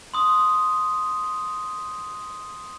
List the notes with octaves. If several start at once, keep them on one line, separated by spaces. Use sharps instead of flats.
C6 D#6